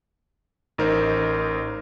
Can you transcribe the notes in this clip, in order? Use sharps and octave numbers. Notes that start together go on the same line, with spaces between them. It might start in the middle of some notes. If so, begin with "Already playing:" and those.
A1 D#4 A#4 C5